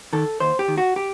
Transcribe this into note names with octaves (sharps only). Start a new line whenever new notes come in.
D#3 A4
D#2 C5
G4
D#3
F#4
G4